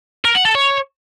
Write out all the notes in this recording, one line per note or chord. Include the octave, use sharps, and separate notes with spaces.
A#4
F#5
A4
C#5